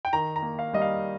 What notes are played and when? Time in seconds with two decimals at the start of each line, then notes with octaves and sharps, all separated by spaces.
0.05 G5
0.13 D#3 A#5
0.36 A#5
0.42 A#3
0.59 F5
0.73 G3 D#5
0.82 F5